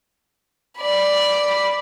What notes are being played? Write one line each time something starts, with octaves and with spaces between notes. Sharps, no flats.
D5 B5